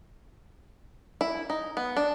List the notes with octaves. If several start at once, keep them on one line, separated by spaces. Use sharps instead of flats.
E4
D#4
B3
D4